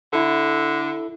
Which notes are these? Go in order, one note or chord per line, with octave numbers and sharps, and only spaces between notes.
D3 E4 A4